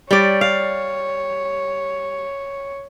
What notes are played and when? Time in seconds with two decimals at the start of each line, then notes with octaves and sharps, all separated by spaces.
0.11 G3 C#5 D5
0.41 F5